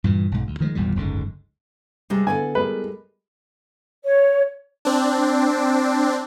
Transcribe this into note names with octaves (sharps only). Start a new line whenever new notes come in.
G2 A#2 E3
B1 G#2
D2
D#3 F3 F#3 G#3
G#1 E2 A#2 G3
F#1 C#2 G#2 D3
C3 G3 G#3
D3 B3 E4 A4 G#5
G3 G#3 A#4 B4
C#5
C4 D4